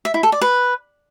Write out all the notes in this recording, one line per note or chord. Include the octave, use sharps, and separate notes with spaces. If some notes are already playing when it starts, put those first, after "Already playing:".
E5
E4
A4
D5
B4